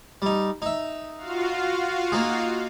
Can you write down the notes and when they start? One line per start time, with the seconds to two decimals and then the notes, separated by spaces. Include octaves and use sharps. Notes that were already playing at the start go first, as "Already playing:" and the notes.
0.22 G3 D#4
0.62 D#4 E5
1.17 F4 F#4 F5
2.12 A#3 D#4 G#4